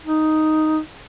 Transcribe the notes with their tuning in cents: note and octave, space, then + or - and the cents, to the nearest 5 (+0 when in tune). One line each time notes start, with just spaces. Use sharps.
D#4 +0